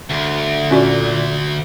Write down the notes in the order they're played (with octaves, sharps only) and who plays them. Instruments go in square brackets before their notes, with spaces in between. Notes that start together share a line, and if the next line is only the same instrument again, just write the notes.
[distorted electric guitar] D2
[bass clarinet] A#2 [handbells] C#4 F#4 D5